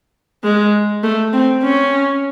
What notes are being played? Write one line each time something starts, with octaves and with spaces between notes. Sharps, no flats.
G#3
A3
C4
C#4